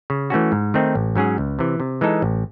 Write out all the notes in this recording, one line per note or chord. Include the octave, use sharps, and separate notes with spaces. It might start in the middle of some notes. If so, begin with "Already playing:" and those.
C#3
E3 A3 C#4 F#4
G#2
D#3 A3 C4 D#4
A1
G#2 F#3 C#4 G#4
C#2
C3 E3
C3
E3 G#3 D#4 A4
A1